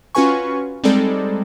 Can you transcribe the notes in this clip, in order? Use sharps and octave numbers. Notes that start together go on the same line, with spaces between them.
C#4 F4 F#4 B4 G#5 C#6
G3 G#3 C4 D#4 A4 D5